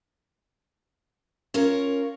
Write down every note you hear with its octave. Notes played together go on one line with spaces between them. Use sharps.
C#4 F4 A#4 C#5